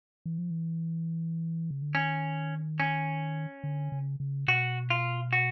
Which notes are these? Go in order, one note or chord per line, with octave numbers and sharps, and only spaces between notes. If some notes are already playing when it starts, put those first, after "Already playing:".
E3
F3
E3
C#3
D3
D#3 C#4
C#4
D3
C#3
C#3
B2 F#4
F4
F#4